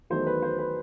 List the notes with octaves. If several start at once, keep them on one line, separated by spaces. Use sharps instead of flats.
E2 D#3 F#3 A3 D#4 C5
B4
C5
B4